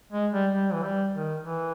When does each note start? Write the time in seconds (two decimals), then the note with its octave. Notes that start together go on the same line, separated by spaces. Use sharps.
0.12 G#3
0.32 G3
0.53 G3
0.73 E3
0.82 G3
1.13 D#3
1.43 E3